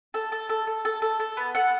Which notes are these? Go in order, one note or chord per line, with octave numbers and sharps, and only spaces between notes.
A4 A5
A4
A4
A4
A4
A4
A4
B3
A4 F#5